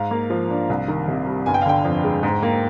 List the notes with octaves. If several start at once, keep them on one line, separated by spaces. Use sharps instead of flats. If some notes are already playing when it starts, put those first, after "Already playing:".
Already playing: G#2 F5
A#3
F3
D4
C2
D#3
C3
G3
G1 G#5
G5
F5
D3 G5
F2
G#3
G#2
A#3